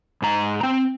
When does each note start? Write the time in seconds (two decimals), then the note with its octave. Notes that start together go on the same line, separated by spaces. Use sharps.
0.22 G#2 A#5
0.63 C4